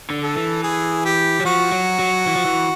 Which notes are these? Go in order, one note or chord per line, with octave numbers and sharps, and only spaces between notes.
D3
A4
E3
G#4
G4
F#3
F3 F#4
F#3
F#3
E3
F3
E3